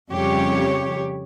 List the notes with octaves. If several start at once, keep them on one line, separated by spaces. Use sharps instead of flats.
F2 C#3 G3 G4 C#5